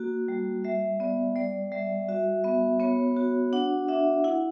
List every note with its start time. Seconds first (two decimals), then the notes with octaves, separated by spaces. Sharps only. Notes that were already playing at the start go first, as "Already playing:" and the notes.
Already playing: A#3 F#4
0.28 G3
0.64 G3 E5
1.00 B3 D5
1.36 G3 D5
1.72 G3 E5
2.09 F#4 E5
2.44 B3 E5
2.80 B3 C#5
3.16 F#4
3.53 D4 F#5
3.88 D4 E5
4.24 E4 F#5